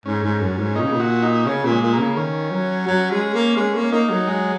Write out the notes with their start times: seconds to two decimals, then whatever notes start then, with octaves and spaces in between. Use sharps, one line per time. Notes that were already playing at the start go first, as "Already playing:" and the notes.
0.06 G#2 C#4
0.24 G#2
0.41 F#2
0.58 G#2
0.76 A#2 D#4
0.84 C#3
0.93 A#2
1.00 F#4
1.22 D#4
1.46 C#3 C#4
1.64 A#2
1.70 G#3
1.81 A#2
1.93 A#3
1.99 C#3
2.17 D#3 C#4
2.51 F#3
2.87 F#3
3.11 G#3
3.34 A#3
3.57 G#3 C#4
3.74 A#3
3.81 C#4
3.92 A#3 D#4
4.09 F#3
4.27 G#3